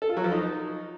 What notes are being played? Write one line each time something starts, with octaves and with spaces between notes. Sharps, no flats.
A4
F4
F#3
F3
D#4